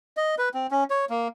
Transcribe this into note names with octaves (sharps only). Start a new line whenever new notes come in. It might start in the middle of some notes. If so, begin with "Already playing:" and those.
D#5
B4
C4
C#4
C#5
A#3